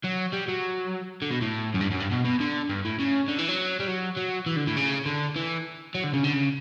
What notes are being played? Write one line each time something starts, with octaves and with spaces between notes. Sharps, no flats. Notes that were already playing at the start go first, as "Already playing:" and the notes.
F#3
G3
F#3
D3
B2
A2
F#2
G2
F#2
G2
B2
B2
D3
G2
A2
C#3
D3
E3
F#3
G3
F#3
F#3
E3
D3
A2
C#3
D3
E3
F#3
D3
C#3
D3
C#3